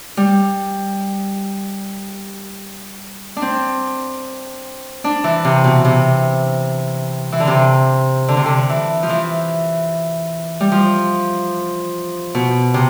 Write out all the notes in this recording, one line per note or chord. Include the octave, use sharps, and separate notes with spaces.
G3
D4
C4
D4
E3
C3
B2
C3
E3
D3
C3
D3
C3
D3
E3
F3
E3
G3
F3
B2
C3